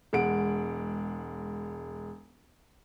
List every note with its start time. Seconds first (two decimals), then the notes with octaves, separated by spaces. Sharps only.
0.13 E1 G#3 F#5 D7